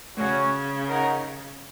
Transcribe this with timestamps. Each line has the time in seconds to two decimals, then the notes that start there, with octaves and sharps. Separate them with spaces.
0.17 C#3 C#4 F#4 C#5
0.87 D#4 A#4 C#5 F#5